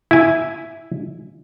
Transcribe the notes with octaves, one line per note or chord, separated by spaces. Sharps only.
E4 G#5